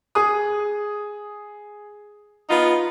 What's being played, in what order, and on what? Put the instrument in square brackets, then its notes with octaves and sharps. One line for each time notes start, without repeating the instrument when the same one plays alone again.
[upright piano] G#4 D#6
[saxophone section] B3 D#4 F4